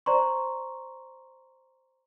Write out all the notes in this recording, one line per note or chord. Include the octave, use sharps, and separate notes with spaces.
C5 D5 A#5 C6 C#6